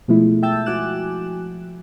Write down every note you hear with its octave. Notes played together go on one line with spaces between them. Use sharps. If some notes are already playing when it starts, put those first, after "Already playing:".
B2 F3 G#3 A3 E4
E5 G5 A5 E6 G6 A6
F3 F#4 G#5 D6 F#6 E7